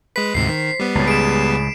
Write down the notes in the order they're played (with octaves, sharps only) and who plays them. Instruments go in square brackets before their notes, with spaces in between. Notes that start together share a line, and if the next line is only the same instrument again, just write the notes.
[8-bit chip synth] G#3 B4 [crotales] B6
[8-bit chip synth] D2 G#2 C3 [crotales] C7
[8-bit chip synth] D#3 [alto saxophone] C5
[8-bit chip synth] G3 B3
[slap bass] C#2 A2 [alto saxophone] C#4
[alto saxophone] G#4 [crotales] D7 E7